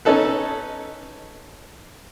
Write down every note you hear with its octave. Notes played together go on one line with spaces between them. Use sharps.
C#4 D#4 A4 B4